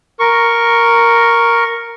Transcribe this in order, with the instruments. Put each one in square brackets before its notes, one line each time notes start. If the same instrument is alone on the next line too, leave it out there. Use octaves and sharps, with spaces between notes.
[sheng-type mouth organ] A#4 C#6